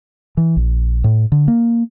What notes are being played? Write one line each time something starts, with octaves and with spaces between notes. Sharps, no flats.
E3
A#1
A2
D3
A#3